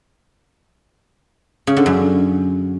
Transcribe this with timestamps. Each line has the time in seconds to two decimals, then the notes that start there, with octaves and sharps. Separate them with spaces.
1.67 C#3
1.77 D3
1.86 F#2